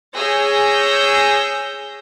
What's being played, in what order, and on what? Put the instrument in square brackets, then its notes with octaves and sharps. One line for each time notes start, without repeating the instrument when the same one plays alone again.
[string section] G#4 C#5 E6 G6 A#6